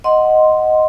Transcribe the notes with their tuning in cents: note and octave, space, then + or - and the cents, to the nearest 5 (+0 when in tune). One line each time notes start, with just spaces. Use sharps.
D#5 +0 F#5 +0 C6 +0